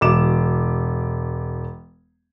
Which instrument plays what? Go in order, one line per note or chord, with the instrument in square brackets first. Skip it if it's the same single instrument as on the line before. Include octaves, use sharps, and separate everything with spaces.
[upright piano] E1 D6 E7